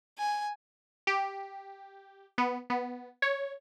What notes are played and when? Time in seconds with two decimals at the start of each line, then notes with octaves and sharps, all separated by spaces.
0.18 G#5
1.07 G4
2.38 B3
2.70 B3
3.22 C#5